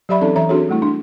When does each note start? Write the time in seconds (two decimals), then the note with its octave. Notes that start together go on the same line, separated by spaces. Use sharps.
0.09 F#3 G4 D5 E5 B5 C#6
0.21 E3 C4 C#4 D#4 A4 D5
0.36 E3 E5 A#5
0.49 C4 D4 F#4 G#4 A4 C#5
0.69 G3 A3 E4
0.82 D4